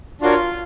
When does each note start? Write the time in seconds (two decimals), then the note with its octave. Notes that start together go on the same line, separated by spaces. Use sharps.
0.21 D4 F4 F#4 A#4 C#5